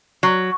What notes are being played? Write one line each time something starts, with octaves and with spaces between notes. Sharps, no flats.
F#3